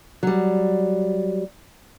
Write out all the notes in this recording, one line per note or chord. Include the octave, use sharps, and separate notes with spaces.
F#3 G3